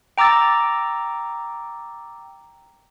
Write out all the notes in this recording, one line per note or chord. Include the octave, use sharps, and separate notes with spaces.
G5 A#5 D6 E6 A6